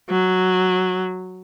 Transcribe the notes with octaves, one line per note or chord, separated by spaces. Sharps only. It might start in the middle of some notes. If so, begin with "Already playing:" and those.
F#3